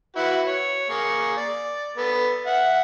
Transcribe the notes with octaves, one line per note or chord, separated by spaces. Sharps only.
E4 F#4 B4
C#5
A#3 G#4 C#6
D5
B3 A4
E5 F#5